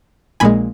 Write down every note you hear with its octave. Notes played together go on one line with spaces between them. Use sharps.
A#1 A#2 G#3 G#5 B5